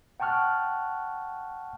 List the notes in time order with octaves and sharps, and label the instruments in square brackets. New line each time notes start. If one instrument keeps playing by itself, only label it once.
[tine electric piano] F#5 G5 A5 C#6 F6 F#6